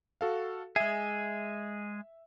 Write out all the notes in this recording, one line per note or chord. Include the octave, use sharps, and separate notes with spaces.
F#4 A4 F5
G#3 G#4 E5